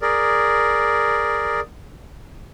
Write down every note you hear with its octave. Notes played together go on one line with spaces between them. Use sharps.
G#4 A#4 D5